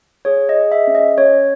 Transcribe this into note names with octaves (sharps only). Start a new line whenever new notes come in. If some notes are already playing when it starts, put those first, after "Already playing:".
G#4 C#5
D#5
G#4
E5
C#4
D#5
C#4 C#5